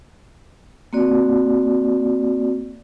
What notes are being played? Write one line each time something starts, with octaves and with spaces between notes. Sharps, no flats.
A#3 C4 F#4 D5